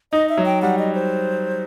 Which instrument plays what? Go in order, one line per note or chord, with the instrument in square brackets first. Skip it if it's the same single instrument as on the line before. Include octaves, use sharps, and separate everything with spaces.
[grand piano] D#4 [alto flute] D#5
[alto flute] E5
[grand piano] F#3
[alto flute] G5
[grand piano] G3 [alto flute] F#5
[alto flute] D#5
C5